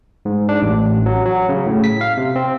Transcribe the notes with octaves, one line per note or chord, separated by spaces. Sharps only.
G#2
D4
A1
F#3
F#3
C#3
A2
B6
F5
C3
C4